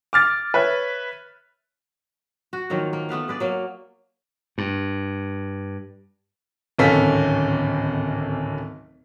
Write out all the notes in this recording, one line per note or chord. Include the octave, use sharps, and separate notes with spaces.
D6 F6 A6
B4 C#5 E5
F#4
D#3 F3 F#3 A#3
A#3
A3 B3 B4 F5
G#4 B4 D5
F#3 A#3
G2
D1 G#1 C#4 A4 F5 B6